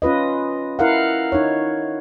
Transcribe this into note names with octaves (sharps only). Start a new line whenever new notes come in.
C#4 F4 B4 D#5
E4 A#4 F5 F#5
D#4 C#5